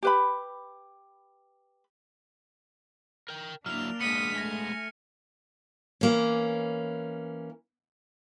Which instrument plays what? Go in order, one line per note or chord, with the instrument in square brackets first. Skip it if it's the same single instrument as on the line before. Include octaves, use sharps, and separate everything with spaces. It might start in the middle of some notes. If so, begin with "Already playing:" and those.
[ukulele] G4 B4 B5
[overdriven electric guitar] A#4 G5
[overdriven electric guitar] F#3 E4 [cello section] A#3 D4 [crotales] F6 F7
[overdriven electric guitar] G#3 B3 [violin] D#6 B6 [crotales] C#7
[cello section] A3 [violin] G#5 [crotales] A#6
[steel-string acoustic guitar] E3 A#3 C#4